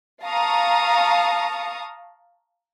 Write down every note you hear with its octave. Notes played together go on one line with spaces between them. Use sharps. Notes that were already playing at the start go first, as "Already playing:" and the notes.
F5 A5 A#5 C#6 D#6